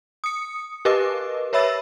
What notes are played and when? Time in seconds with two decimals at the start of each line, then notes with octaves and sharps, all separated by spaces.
0.24 D#6 C#7
0.85 G4 A#4 B4 D#5 D6
1.53 B4 C#5 E5 B5 E6 A6